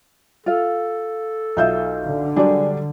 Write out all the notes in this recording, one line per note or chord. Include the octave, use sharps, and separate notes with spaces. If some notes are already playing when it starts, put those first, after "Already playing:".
F4 A4 F5
B1 D#4 F4 E5 F5 G6
D3
F#3 G3 D4 G#4 D5